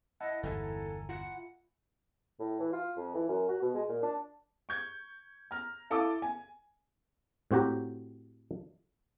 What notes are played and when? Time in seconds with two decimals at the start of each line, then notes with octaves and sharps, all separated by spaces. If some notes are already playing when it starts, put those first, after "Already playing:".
0.21 E4 D#5 F#5 A5
0.43 G1 E2 G#2 A4 G#5 A#5
1.09 F4 F#5
2.40 A2
2.60 E3
2.73 F4
2.97 F2
3.15 E3
3.28 F#2
3.49 F#4
3.62 B2
3.75 G#3
3.89 A#2
4.03 D4
4.69 C#6 G6 G#6
5.51 A#5 F6
5.90 E4 A4 F5 A5 D6 D#6
6.22 G#5
7.51 A2 C4 F#4 G4 A#5